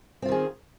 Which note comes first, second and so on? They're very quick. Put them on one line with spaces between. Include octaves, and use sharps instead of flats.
C4 F4 D#3 G#4